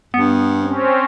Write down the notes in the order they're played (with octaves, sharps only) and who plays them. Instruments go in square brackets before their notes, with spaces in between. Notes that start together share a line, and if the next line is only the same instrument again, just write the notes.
[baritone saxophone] G2 [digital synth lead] B3
[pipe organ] C4 C#4